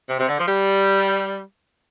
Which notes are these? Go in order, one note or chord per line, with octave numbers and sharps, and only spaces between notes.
C3
C3
D3
F3
G3